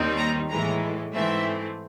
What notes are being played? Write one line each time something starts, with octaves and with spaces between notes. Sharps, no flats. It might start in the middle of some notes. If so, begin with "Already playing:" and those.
Already playing: D#2 D#3 G3 C4 D#4
A#5
A2 E3 G#3 A#5
G#2 E3 A3 C4 E5